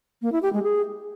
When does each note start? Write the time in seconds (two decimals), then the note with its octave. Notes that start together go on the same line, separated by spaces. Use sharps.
0.22 A#3
0.32 E4
0.43 G4
0.53 G#3
0.63 G#4